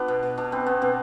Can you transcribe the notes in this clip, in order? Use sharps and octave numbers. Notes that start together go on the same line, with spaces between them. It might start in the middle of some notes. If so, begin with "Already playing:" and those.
Already playing: B3 D4 F4
B2
B2
B2 D4
B3 C4
B3 C4
B2 C4